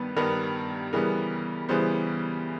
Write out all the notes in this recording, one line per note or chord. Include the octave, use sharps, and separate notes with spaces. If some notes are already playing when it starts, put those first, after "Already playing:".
Already playing: G2 D#3 G3 B3 B4
G2 D#3 G3 B3 A#4
C#3 E3 G3 B3 A#4
C#3 E3 G3 B3 C5